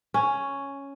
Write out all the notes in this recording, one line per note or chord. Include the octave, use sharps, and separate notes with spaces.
C#4